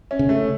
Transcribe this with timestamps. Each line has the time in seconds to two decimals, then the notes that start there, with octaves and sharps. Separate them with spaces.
0.11 C#4
0.19 C#3
0.29 A3